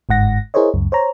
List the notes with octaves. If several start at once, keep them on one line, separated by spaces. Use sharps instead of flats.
G1 G#2 F#5 A#6
E4 G#4 A#4 C5 C#5 D#5
C#2 F#2
C5 C#5 A#5